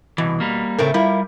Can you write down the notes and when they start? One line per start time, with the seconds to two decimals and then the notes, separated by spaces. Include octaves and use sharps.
0.18 C2 B2 E3
0.40 G3 A#3
0.79 A2 C#3 A3 C4 A#4
0.94 G3 E4 F4 A#4